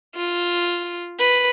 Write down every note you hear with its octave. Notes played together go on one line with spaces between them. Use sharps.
F4
B4